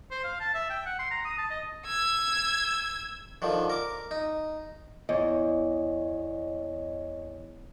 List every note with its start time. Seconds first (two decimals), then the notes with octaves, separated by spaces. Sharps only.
0.11 C5
0.24 F5
0.40 A5
0.54 E5
0.70 G5
0.86 F#5
0.99 C6
1.11 A#5
1.25 D#6
1.38 A5
1.50 D#5
1.86 E6 G#6
3.42 D3 D#3 F3
3.70 A#4 D6
4.11 D#4
5.09 E2 C#5 D#5